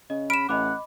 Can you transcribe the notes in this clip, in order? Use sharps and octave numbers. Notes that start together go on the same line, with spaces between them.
C#3 D#5
B5 F6 D7 E7
A1 D#5 F#5 B5 D6